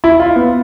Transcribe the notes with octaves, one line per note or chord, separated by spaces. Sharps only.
E4
F4
B3